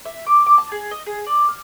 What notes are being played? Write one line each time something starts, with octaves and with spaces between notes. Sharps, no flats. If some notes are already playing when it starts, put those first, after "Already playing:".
E5
D6
D6
A5
G#4
D#5
G#4
D5
F6